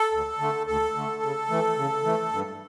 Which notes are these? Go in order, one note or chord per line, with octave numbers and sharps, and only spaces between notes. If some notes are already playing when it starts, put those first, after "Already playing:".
Already playing: A4
D2
D3 A3
D2 A4
D3 A3
C#3
E3 A3
C#3
E3 A3
G2